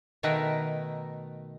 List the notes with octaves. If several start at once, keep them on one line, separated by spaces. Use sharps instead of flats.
B2 D#3 A3 A#4 B4